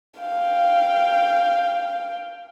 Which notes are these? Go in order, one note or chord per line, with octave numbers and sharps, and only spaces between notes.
F5 G5